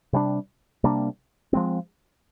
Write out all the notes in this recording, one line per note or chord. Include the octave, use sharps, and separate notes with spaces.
C3 G3 A#3 D4
C3 G3 A#3 D4
F3 G#3 C4